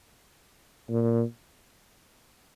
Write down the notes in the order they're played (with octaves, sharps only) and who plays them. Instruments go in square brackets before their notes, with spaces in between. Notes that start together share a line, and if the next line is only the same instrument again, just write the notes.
[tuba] A#2